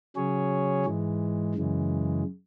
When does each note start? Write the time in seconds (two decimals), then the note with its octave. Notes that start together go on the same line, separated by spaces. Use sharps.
0.16 C#3 F#3 C#4 G#4 C#5
0.85 G#2 E3 G#3
1.55 F#2 C#3 E3 G#3